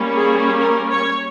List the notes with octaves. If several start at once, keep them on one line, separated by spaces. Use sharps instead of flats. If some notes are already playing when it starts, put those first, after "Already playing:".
Already playing: G3 A#3 C#4
G#4
A#4
C#5